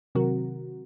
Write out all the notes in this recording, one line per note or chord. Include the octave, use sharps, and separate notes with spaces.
C3 D#3 F#3 C4 F#4 A#4